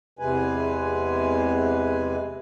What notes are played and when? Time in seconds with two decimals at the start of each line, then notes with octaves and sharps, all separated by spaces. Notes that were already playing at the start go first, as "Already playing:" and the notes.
0.19 E2 C3 G#3 B4 G#5